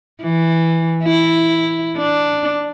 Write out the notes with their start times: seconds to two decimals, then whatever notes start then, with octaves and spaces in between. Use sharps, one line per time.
0.23 E3
1.03 E4
1.97 D4